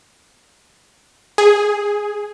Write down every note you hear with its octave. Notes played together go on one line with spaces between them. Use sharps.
G#4